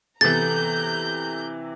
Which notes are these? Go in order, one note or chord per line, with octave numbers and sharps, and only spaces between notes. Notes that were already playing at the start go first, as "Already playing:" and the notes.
C3 E3 B3 A4 A#5 G6 A6